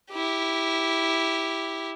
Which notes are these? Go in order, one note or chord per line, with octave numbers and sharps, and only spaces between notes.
E4 G4